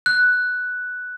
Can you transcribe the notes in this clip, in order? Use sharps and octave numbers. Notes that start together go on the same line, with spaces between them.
F#6